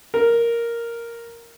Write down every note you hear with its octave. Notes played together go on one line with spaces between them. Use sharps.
A#4